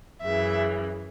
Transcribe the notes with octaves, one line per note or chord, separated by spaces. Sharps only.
F#2 C#3 E3 E5